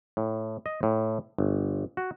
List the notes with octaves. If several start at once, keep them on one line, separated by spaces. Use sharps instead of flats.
A2
D#5
A2
G1
F#4